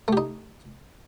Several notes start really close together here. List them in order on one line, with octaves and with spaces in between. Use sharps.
A3 G4 D#4